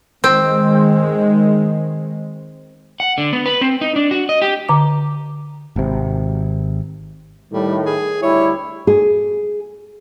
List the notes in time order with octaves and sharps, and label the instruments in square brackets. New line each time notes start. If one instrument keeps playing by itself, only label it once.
[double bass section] D#3 G#3 [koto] C4
[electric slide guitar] F#5
D3
B3
B4
C4
D#4
D4
F#4
D#5
G4
[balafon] D3 D6
[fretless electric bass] G#1 C3
[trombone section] A2 D#3 [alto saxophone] G3
[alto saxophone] G#4
[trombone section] D2 G3 E4 [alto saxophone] C#5
[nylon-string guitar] G#4